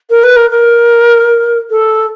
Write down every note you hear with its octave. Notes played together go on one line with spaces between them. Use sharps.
A#4
B4
A#4
A#4
A4